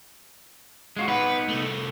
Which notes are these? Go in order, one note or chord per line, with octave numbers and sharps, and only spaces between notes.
G#3 F4 F#4
B3 D#4 B4 F#5
C2 A3